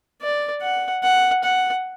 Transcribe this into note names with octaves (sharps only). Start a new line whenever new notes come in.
D5
F#5
F#5
F#5